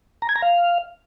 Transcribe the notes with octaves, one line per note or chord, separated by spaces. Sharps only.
A#5
G#6
A#5
F5